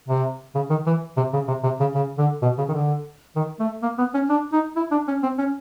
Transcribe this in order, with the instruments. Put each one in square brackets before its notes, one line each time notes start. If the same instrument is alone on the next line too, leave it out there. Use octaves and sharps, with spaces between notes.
[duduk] C3
C#3
D#3
E3
C3
C#3
C3
C3
C#3
C#3
D3
B2
C#3
D#3
D3
D#3
A3
A#3
B3
C#4
D4
D#4
E4
D4
C#4
C4
C#4